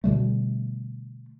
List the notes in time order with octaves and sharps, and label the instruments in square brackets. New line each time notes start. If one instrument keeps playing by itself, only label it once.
[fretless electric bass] B2 D3 G3 A3